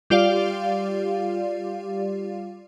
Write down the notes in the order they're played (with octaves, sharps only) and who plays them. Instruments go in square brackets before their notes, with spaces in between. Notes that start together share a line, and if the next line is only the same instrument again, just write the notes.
[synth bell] G3 F4 G4 D5 F5